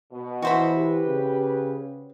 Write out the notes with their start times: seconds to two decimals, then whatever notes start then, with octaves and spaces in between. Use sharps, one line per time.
0.12 B2
0.42 E3 F#4 C5 B5
0.74 G4 B4
1.06 C#3